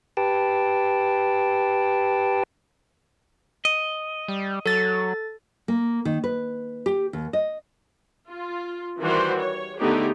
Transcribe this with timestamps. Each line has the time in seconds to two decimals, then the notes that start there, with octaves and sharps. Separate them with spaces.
0.17 G4 B4 G5 A5
3.65 D#5
4.28 G3
4.66 F#3 A4 A6
5.68 A#3
6.05 D#3
6.24 B4
6.86 G4
7.13 D#2
7.33 D#5
8.28 F4
9.00 D#3 E3 G3 F#4 C5
9.38 C#5
9.79 D3 A3 B3 D#4 G4 G#4